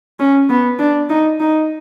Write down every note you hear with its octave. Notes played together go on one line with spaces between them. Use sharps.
C#4
B3
D4
D#4
D#4